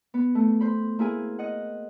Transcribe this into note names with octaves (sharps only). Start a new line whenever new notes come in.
B3
A3
C5 B5
A#3 E4 G#4 G#5
D#5 F#5